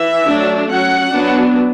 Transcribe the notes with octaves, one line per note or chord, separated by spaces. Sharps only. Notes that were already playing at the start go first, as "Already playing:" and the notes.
Already playing: E3 E5
F#3 A3 D4
F#3 C#4 F#5
F#3 B3 D4